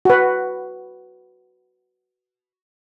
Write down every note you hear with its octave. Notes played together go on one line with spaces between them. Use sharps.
F#4 B4